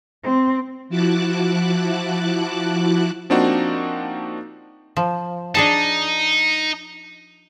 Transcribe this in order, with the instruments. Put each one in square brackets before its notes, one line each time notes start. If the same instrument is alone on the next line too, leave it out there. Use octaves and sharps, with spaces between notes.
[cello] C4
[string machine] F3 E4 F#4 A5 D6 F#6
[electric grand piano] F3 A#3 C4 D4 D#4 F#4
[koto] F3
[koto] D4 G#4 A5 [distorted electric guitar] D#4